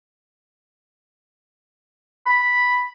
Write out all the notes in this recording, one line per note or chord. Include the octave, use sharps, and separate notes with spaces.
B5